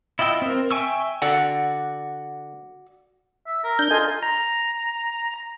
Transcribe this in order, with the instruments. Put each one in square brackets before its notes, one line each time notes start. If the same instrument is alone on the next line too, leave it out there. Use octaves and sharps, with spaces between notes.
[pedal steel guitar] E4 F4 D#5 G5 E6
C4 A#4
E5 G5 G#5 C#6 E6
[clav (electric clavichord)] D3 [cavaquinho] F#4 [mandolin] D5 F#5 E6
[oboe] E5
A#4
[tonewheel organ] D4 [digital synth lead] G6
[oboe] F4 [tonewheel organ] A4 D#5 G#5
[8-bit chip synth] A#5